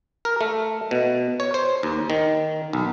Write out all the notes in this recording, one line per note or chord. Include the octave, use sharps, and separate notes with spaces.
A#4
A3
B2
C#5
C5
D#2
D#3
B1